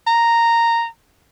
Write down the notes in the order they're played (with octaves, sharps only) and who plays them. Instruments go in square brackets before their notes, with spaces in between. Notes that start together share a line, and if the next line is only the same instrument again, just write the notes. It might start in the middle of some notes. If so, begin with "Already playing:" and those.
[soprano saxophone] A#5